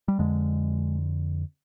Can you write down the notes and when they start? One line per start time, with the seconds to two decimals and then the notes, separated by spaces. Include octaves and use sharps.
0.08 G3
0.19 F2 D3 G#3